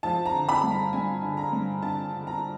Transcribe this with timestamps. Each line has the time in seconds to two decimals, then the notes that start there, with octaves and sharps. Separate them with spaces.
0.03 F3 A5
0.26 A#5
0.33 D3
0.49 B5
0.63 G2
0.71 A#5
0.93 G2 G#5
1.22 D3
1.37 A#5
1.53 G2
1.82 D3 A5
2.12 D3
2.27 A#5